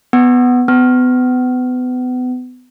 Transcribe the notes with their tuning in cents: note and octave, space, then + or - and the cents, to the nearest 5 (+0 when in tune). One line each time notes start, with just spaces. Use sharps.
B3 +5
B3 +30